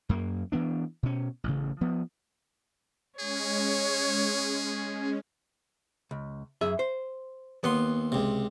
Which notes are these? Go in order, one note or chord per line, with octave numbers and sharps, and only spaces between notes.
F#2 A#3
E3 B3 D4
B2 C#4
A1 C#3
F3 B3
G#3 C#4 G#4 C#5
C#2
F#2 G#4 E5
C5
D#2 B3 C6
C#2 C3